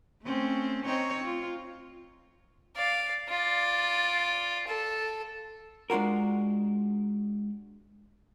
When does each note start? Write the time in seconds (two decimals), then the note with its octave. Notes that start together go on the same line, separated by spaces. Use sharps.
0.22 A3 C4 C#4
0.85 C4 D#4 C#5
1.24 F4
2.76 D5 F5
3.29 F4 D5
4.68 A4
5.90 G#3 D4 F4 F#4 A#4